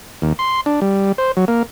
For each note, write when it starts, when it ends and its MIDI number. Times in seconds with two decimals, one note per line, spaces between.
0.22 0.33 39
0.39 0.61 84
0.66 0.80 62
0.81 1.12 55
1.18 1.32 72
1.37 1.45 54
1.48 1.63 58